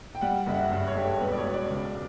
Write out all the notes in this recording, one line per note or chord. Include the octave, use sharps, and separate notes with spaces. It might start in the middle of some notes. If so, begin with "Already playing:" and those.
G5
G3 F#5
F#1 E5
F#5
G2 E5
C#5
G2 G4
A4
E1 B4
D5
C#5
E1
D5
C#2